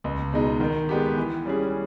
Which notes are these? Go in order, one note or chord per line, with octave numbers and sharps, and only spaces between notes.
C#2
B2 G#3 D#4
D#3
G#3 B3 G4
E3
G3 C#4 G#4